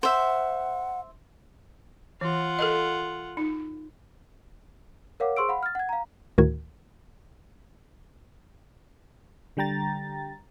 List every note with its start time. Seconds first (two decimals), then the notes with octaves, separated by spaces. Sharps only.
0.03 C5 E5 F#5
2.21 E3 F4 F#5
2.59 A4 A#4 D#5
3.37 D#4
5.20 A#4 C#5 F5 F#5 D6
5.37 G#4 C5 C6 C#6 E6 D7
5.49 F5 F#5 B5
5.63 F6 A6
5.75 F#5 G#6
5.89 F5 A#5
6.38 D2 A2 D#3 F#4 A#4 G#6
9.57 D3 G3 G5 A#5 A6